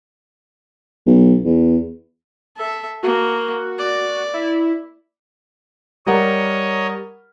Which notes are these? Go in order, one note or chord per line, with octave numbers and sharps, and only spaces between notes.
B1
E2
A4 E5
A#3 F#4
D5
E4
G3 A#4 C#5 D#5 F#5